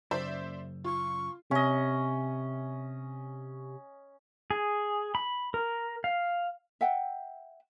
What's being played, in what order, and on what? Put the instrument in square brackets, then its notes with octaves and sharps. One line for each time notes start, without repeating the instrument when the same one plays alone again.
[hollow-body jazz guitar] F#2 C#3 [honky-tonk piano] C5 D5 E5
[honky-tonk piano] F4 [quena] C#6
[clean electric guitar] C3 [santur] C#4 D#5
[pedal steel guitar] G#4
B5
A#4
F5
[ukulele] E5 F#5 G5